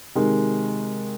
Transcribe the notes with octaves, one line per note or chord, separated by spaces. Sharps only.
C3 D#3 G#3